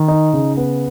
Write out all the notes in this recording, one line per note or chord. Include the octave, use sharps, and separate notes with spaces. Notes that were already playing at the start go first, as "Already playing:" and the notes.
Already playing: D#3
D#4
C#3
B3